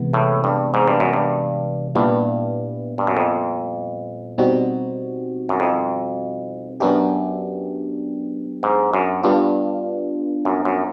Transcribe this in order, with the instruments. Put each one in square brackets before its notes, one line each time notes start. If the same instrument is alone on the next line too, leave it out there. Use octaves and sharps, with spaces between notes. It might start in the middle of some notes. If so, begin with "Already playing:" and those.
Already playing: [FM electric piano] C3 E3 G#3 B3
[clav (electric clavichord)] A2
G2
G#2
G2
F#2
G2
[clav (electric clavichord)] G2 [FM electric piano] A#2 G3 B3 E4
[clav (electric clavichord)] G2
F#2
F2
[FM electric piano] B2 G3 C4 D#4 F#4
[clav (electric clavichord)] F#2
F2
[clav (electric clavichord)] F#2 [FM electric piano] F#3 B3 D4 G4
[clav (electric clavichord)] G#2
F#2
[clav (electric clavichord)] G2 [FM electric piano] G3 B3 D4 F4
[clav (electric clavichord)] F#2
F#2